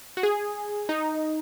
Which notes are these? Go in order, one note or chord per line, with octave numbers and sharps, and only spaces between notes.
F#4
G#4
D#4